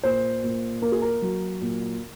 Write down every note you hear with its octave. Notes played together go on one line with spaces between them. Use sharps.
A#2 C5
A#2
A#3 A#4
G#4
A#4
F#3
A#2